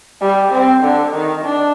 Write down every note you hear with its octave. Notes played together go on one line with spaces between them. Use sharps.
G3
C4
D3
D#3
D4